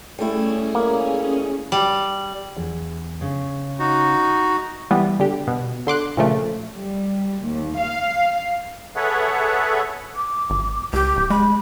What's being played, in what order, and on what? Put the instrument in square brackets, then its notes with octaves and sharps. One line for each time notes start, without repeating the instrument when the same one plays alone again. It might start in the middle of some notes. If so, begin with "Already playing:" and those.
[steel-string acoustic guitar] G3 A3 E4 [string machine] C#4 G#4
[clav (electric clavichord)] A#3
[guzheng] G3
[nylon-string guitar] E2
C#3
[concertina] D#4 F#4
[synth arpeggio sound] E3 G3 B3
D3 G4
B2
D3 C6 D6 F#6
A#2 C#3 F3 A3
[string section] G3
D#2
F5
[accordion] G#4 A4 B4 C#5 E5 F#5
[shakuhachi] D6
[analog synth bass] G#1
[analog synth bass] C#2 [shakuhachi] G4
[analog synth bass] D1
[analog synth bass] G#3 [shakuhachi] B5